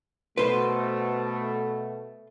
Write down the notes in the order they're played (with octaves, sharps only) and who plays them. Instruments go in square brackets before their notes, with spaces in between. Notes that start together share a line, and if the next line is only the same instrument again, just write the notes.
[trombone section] B2 A3 [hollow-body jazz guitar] B4 C5